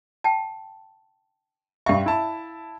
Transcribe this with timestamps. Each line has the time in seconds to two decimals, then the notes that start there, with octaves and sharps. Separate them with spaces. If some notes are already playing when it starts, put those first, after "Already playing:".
0.24 G5 A5
1.86 G2 E5 F5 G5 C#6
2.06 E4 A5